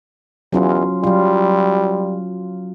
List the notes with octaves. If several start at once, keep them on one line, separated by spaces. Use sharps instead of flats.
E2 F#3 C#4 F4
F#3 G3 F4